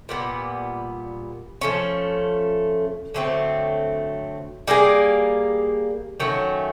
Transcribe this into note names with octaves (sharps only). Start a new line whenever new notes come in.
A#2 G3 B3
F3 A3 C#4
D3 F#3 A3 C4
G3 A#3 D#4 G#4
D#3 F#3 A3 C#4